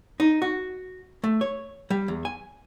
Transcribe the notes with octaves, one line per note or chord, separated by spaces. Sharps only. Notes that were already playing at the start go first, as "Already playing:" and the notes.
D#4
F#4
A3
C#5
G3
E2
G#5